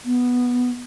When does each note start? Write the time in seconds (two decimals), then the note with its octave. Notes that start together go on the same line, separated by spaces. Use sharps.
0.05 B3